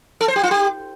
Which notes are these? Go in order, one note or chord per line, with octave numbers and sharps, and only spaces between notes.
A4
C5
G4
F4
G4